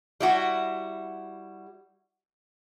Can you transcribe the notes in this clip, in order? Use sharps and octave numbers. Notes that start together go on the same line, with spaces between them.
G3 E4 F#4